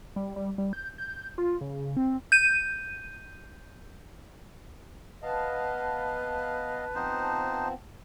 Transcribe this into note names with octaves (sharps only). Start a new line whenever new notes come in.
G3
G3
G3
G6
G6
F4
C#3
C4
G6 D#7
B3 B4 D#5 F5 A5
F3 B3 C4 D#4 C5